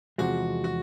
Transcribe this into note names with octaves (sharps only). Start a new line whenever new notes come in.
E2 C3 F3 G#3 F#4
F#4